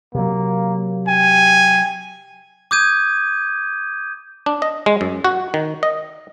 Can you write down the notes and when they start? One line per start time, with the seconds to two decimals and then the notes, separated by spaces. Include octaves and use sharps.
0.15 C3 F#3 A#3
1.08 G5 G#5
2.71 D6 D#6 G6 G#6 D#7
4.46 D4
4.62 D#5
4.86 G#3
5.01 F#2
5.25 F#4
5.54 D#3
5.83 D#5